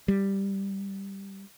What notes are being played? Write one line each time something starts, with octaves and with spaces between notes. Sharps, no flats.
G3